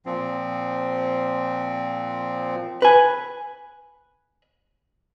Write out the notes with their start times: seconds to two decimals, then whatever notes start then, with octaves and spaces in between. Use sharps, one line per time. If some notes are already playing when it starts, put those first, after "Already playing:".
0.06 A#2 F3 C4
2.82 B4 G#5